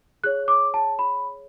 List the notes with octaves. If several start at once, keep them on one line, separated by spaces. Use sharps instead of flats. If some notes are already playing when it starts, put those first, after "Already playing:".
G#4 C#5 F#6
D6
A5
B5